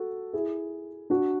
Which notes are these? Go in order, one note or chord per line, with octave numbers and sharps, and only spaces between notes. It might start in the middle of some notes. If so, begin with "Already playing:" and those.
Already playing: F#4 A4
E4 G#4
D4 F#4